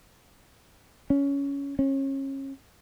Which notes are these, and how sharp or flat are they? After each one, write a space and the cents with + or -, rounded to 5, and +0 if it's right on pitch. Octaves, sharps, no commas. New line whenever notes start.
C#4 +15
C#4 -30